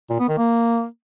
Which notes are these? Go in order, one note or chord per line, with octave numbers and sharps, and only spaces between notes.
A#2
B3
D#3
A#3